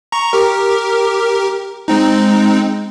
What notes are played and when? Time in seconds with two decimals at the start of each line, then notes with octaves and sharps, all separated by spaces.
0.12 A#5 C#6
0.33 G4 A#4
1.88 G#3 C4 D#4